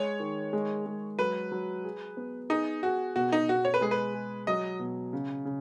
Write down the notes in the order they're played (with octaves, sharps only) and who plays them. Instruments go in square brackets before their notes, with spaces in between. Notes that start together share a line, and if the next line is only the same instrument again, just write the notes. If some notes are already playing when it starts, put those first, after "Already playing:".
Already playing: [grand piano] G#3 [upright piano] C#5
[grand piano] D#3
G#3
G#3
[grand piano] F#3 [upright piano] B4
[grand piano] F#3
G#4
B3
[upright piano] D#4 [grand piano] G#4
[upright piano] F#4 [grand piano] G#4
[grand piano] B2 [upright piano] F#4
[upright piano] D#4
[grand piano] B2 [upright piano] F#4
[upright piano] C#5
B4
[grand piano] G#3 [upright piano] G#4
[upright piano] B4
[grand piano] G#4
[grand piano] F#3 [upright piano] D#5
[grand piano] B2
C#3
C#3